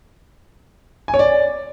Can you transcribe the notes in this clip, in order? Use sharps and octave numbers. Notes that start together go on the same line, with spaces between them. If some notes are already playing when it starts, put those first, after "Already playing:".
G#5
C#5
D5